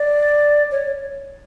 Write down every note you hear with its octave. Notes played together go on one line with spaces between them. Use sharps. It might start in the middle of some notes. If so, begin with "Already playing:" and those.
Already playing: D5
C#5